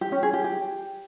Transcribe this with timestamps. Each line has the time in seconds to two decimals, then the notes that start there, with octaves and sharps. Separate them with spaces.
0.01 G4
0.12 C#4
0.23 G#4
0.33 G4
0.44 G4